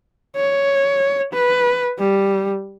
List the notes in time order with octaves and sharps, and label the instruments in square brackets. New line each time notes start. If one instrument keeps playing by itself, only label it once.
[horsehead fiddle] C#5
B4
G3